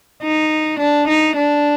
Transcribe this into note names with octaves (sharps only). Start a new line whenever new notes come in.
D#4
D4
D#4
D4